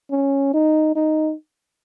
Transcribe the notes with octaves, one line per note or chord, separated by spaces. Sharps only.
C#4
D#4
D#4